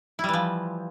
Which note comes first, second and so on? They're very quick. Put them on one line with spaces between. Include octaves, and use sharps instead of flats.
E4 G3 E3 F3